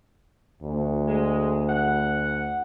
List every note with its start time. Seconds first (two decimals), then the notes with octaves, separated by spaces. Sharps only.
0.62 D2
1.07 G#3
1.68 F#5